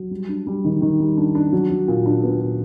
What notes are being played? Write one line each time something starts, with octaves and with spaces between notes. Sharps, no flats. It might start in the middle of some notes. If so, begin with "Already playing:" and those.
Already playing: F#3
G3
D4
G3
D#3
D#3
G3
D4
D4
F#3
F#3
A#2
D4
B3
A#2